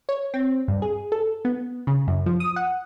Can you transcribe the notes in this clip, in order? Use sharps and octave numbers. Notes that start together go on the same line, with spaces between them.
C#5
C4
G2
G#4
A4
B3
C#3
F#2
F3
D#6
F#5